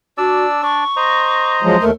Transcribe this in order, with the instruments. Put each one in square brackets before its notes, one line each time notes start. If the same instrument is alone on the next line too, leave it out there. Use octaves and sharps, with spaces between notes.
[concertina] D4 D5 E6 [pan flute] F#4
[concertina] D4 D5 [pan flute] C#6
[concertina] C5 D#5 A#5
[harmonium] F3 F#3 G#3
[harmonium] D#2 A3 [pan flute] A#4